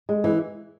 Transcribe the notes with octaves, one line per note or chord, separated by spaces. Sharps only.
G#3
E3